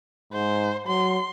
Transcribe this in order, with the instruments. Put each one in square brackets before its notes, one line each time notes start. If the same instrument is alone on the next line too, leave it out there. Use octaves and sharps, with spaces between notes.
[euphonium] G#2 [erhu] C5
[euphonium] F#3 [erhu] C6